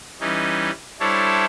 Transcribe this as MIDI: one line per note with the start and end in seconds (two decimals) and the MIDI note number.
0.21 0.71 52
0.21 0.71 55
0.21 0.71 61
0.21 0.71 63
1.00 1.45 55
1.00 1.45 62
1.00 1.45 64
1.00 1.45 69
1.00 1.45 72
1.00 1.45 73